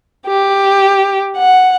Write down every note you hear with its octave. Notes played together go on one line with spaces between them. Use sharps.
G4
F#5